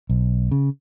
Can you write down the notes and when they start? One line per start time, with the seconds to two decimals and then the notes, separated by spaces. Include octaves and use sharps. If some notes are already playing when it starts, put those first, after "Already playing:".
0.09 B1
0.51 C#3